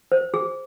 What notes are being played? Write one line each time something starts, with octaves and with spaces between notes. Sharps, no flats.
C5
G#4